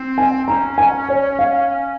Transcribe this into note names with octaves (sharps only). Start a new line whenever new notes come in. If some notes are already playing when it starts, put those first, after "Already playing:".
Already playing: C4
G#5
C#4 A#5
G#5
C#5
F5